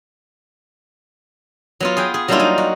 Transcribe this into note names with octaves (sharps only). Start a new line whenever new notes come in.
F#3 B3 F4
G#4 B4 G5
G#4
F#3 G3 A#3 D4 E4 F4
D#4
F#4